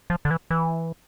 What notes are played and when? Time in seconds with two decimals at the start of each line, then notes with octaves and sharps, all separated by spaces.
0.10 F3
0.25 D3
0.31 E3
0.51 E3